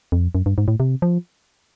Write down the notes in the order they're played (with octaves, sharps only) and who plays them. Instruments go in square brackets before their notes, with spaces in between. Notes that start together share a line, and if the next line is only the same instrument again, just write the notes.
[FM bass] F2
F#2
G2
G#2
A2
C3
F3